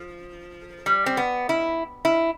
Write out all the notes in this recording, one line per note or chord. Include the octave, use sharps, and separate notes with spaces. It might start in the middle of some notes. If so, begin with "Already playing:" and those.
Already playing: F3
G3
C4
B3
E4
E4